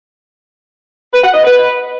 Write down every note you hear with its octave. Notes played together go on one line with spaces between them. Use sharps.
B4
F#5
D#5
B4